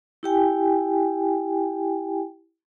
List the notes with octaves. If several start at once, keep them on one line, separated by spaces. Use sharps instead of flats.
E4 G4 G5 G#5